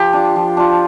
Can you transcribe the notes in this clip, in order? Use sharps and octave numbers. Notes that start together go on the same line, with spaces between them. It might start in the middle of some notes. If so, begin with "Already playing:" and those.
Already playing: F3 G4
D4 F4
F3
D4 F4